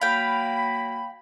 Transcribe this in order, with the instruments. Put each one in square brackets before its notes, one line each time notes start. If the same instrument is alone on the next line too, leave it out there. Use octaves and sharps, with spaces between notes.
[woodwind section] F#3 A#3 B5 [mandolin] F5 G5